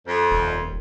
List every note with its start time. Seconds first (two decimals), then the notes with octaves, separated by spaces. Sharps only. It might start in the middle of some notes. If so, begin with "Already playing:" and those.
0.06 F2
0.31 D#1